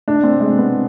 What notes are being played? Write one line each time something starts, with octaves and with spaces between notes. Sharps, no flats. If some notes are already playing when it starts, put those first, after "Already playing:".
D4
C4
G#3
B3